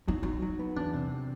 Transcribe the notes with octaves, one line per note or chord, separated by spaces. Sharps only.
F#3 D#4
F#3 D#4
F#3
B3
E2 D4
C3